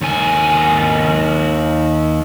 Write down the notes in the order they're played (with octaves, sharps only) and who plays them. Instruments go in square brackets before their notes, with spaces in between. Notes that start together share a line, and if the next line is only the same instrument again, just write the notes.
[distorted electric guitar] D#2 G#5